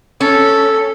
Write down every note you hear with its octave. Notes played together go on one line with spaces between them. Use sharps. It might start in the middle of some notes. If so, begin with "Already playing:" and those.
C#4 A4